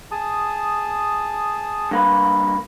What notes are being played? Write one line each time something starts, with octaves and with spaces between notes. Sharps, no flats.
G#4 A5 D#6
G2 A#3 B4